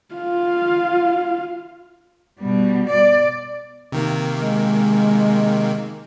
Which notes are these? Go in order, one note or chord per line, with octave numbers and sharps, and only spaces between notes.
F4 F5
B2 G3
D5
C3 D#3 A#3
G#3